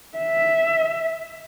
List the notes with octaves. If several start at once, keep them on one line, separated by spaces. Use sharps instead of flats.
E5